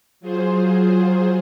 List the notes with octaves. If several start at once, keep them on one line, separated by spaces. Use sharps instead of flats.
F#3 F4 G#4 C5